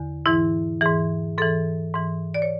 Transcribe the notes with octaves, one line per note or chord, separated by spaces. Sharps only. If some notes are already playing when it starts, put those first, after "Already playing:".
Already playing: E2 D3
G#2 E3 E4
G#2 E3 G#4
G#2 E3 A4
G#2 E3
D5
C#5